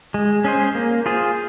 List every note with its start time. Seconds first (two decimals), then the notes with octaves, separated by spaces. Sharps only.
0.14 G#3
0.45 C#4 G#4 C5
0.75 A#3
1.06 F4 G#4 C5